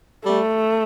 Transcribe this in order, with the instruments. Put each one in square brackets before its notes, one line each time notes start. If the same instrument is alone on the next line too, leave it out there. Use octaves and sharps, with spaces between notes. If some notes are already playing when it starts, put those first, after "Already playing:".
[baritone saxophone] G3 [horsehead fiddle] A3